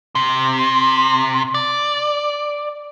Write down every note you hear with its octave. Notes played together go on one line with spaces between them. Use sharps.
C3
D5